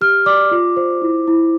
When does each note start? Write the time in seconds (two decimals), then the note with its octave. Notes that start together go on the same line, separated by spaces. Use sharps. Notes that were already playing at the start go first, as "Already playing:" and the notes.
0.01 G4 F6
0.26 D5 D6
0.51 F4
0.77 C5
1.02 E4
1.27 E4